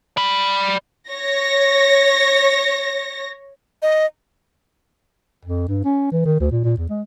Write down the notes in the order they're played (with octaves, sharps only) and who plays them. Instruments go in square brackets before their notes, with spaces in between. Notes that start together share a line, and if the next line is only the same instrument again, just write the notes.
[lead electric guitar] D5 B5
[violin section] C#5 A#6
[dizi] D#5
[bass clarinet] F2
G2
C#4
E3
D#3
D2
A#2
A#2
E2
G#3